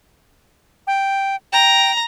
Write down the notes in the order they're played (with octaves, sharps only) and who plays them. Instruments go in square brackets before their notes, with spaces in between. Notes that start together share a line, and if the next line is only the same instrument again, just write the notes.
[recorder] G5
[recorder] G5 [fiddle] A#5